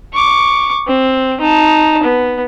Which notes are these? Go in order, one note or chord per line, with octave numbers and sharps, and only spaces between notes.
C#6 D6
C4
D#4 A5
B3